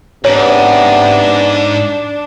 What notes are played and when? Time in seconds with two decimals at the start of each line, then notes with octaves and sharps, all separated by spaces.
0.25 G#2 C3 B3 D4 C#5